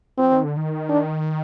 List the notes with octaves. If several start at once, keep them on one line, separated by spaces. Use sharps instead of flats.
F3 C4
D#3
D3
D#3
D4